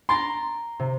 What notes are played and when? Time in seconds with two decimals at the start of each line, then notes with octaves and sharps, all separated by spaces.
0.09 A#5 C6 A6 D7
0.79 C3